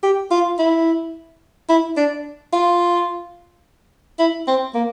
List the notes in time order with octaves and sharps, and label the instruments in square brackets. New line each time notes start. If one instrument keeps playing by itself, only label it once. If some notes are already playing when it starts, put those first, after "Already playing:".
[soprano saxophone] G4
F4
E4
E4
D4
F4
E4
C4
A#3